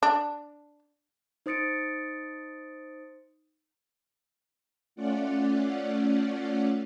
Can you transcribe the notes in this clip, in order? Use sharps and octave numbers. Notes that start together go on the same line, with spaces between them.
D4
D#4 C5 D#6 A6 C#7 D7
A3 C#4 F4 D5 F#5